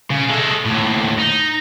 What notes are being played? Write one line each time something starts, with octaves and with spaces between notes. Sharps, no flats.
C#3
G#3 A4
D#2 A2
D#4